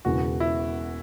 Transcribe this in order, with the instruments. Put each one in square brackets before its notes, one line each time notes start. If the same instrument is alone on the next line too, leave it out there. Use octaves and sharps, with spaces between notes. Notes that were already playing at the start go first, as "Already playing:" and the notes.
[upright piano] E1 E2 C#3 [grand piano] F#4
[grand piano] E4